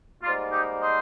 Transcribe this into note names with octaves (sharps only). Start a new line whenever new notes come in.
G#2 G3 A#3 F4
D#4 G4
C5 D#5